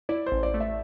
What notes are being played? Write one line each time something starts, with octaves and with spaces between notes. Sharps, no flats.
E4 D5
C5
A1
D5
A3
E5